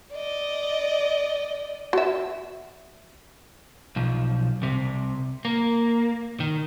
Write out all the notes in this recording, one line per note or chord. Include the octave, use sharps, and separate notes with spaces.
D5 D#5
F#4 E5
B1 F3
C2 C3
A#3
D#3